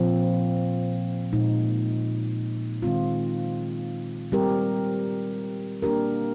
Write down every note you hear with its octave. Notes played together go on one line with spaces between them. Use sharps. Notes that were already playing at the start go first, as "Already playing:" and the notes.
Already playing: A#2 F3 C4
A#2 G#3 D#4
D#3 G#3 C4 F4
G3 C4 G4 A#4
A#3 D4 G4 A#4